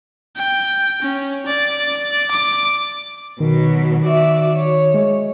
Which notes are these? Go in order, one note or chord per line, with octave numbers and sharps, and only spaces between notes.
G5
C#4
D5
D6
B2 D#3 F#3
F#4 D5 E5
C#5
G#3